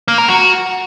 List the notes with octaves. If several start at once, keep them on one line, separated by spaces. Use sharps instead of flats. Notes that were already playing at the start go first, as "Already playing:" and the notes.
A#3
A#4
F#4